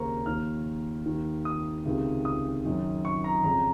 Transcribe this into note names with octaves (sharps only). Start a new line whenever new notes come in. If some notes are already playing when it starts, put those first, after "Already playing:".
Already playing: D#2 C#3 A#4 C5 A#5 C#6
D#2 D#3 F6
D#2 D#3
D#6
C#2 C3 D#3
D#6
F#2 D#3
C#6
A#5
F2 C#3 A#5